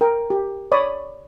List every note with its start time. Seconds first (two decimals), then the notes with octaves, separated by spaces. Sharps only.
0.01 A#4 G5
0.30 G4
0.72 C#5 D5 B5 D#6